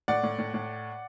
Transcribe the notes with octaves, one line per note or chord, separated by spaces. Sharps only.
A2 D5 F#5
A2
A2
A2